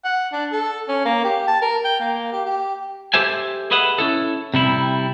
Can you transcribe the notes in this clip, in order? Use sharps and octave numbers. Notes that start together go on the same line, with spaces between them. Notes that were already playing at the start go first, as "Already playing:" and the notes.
F#5
D4
A4
C#4
A#3
G4
A5
A#4
G5
A#3
G4
G4
G4 A4 C5 E5 G#5
G#4 B4 D#5 E5 F#5
C#4 E4 A4
C3 G3 E4